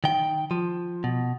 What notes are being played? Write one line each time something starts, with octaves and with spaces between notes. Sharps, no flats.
D#3 G5
F3
B2